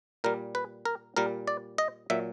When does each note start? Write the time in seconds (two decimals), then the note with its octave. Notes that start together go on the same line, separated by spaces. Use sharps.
0.24 A#2 G3 A#4
0.55 B4
0.85 A#4
1.17 A#2 G3 A#4
1.48 D5
1.78 D#5
2.10 A#2 F#3 E5